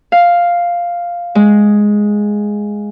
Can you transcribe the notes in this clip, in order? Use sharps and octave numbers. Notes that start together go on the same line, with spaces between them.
F5
G#3